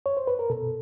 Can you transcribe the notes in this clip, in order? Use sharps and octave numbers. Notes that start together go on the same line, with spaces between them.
C#5
C5
B4
A#4
B2 A4